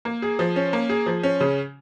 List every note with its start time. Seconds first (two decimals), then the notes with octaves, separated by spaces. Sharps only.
0.05 A#3
0.22 G#4
0.39 F3
0.56 C#4
0.73 A#3
0.89 G#4
1.06 F3
1.23 C#4
1.40 C#3